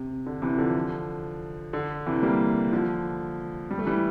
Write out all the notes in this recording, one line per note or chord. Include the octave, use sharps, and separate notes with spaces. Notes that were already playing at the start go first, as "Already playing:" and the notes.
Already playing: C3
D3
C3 E3
D3 F3
D3
C3 E3
G3 A#3
D3 F3
G3
A3
E3 G3